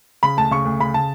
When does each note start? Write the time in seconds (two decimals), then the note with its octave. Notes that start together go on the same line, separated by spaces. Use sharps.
0.23 C#3 B5
0.37 D2 A5
0.51 C#3 C#6
0.65 D2
0.80 C#3 B5
0.94 C#3 A5